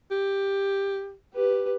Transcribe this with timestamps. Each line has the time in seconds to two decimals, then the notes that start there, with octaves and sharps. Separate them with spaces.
0.11 G4
1.34 G4 B4